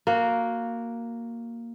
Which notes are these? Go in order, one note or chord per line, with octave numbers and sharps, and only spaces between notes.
A#3 F#4